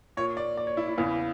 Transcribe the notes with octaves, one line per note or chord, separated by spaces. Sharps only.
A#2 C#5
D5
D5
C#5
E4
E4
E2 C#3 E3